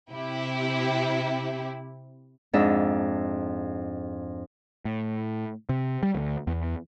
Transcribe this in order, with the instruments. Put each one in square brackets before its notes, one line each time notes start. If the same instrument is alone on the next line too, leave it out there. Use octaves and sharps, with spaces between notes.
[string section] C3 E4 G4
[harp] F2 G#2 D4 D#5 E5
[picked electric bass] A2
C3
G3
D2
E2